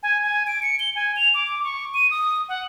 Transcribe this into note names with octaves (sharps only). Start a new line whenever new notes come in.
G#5
G#5
D7
C#7
G7
G#5
F7
D6
C#6
D#7
D#6
F#5